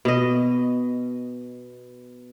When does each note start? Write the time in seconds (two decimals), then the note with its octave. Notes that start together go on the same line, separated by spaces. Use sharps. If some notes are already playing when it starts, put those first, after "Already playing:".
0.05 B2 D#5